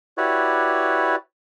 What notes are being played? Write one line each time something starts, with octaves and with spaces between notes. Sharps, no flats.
E4 F#4 G4 B4 C#5 D5